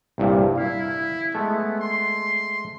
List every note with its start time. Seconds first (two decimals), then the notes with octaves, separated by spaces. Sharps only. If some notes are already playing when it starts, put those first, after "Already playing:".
0.18 C2 G2 A#2
0.58 E4 F5
1.35 G#3 A3 B3
1.80 C6